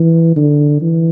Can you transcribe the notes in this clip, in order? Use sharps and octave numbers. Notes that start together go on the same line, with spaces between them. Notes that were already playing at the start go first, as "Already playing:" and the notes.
Already playing: E3
D3
E3